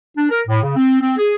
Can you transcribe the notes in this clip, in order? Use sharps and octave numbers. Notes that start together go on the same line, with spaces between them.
D4
A#4
A2
C#3
C4
C4
G#4